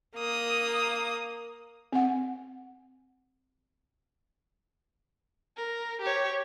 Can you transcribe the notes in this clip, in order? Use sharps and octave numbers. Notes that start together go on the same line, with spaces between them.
A#3 D#6
C4 F#5
A#4
G4 C#5